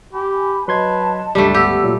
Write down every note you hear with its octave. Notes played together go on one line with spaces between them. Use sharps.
G4 G#5 B5
F#3 B4 D#5 A5 C6 G#6
G1 C#2 G3 A3 D4
B3 G4 E6
A#2 F#3